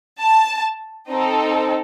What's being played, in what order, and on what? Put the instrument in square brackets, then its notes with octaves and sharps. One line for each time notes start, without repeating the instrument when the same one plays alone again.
[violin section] A5
C4 D#4 A4